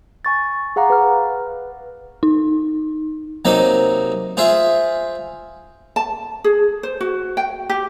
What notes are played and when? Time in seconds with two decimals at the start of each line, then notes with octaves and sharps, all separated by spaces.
0.25 G#5 C#6 A6
0.76 G#4 F5 F#5 A#5 D6
0.90 B4 F6
2.23 D#4
3.45 C3 F#3 A#3 D#4 D#5
4.37 F4 G#4 C5 E5
5.96 A5
6.44 G#4
6.83 C5
7.01 F#4
7.37 G5
7.69 G4